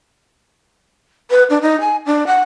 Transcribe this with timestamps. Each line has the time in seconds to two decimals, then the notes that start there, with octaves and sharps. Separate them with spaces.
1.31 B4
1.50 D4
1.62 D#4
1.81 G#5
2.06 D4
2.27 F#5